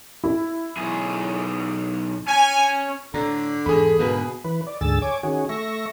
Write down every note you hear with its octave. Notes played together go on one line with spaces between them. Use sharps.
E4
B1 G#4
C#4 G#5
A2 D3 A#5
E2 G#2 G#4 A4 B5
G#2 B2 D3 A#3 B4
E3 B4
D5
D2 G#2 D3 G#4 E6 A6
C#5 G#5 D6
D#3 C#4 F#4 G#4
A3 E5 C#6 A#6